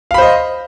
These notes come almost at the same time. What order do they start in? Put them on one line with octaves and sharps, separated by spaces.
F5 B5 C5 D#5